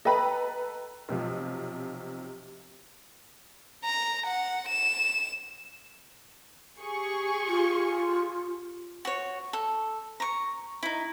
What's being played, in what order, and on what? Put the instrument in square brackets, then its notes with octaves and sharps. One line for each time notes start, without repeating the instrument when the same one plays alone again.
[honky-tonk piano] A4 B4 A#5 [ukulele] D#5 G5 B5
[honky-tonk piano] B1 C3 F3
[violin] A#5
F#5
E7
[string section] G4 G#4 C#6
[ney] F4
[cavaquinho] F#4 C#5
A4
A#5 C#6
D#4 E4